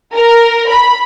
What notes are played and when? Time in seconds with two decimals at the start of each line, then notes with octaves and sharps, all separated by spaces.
0.14 A#4
0.68 B5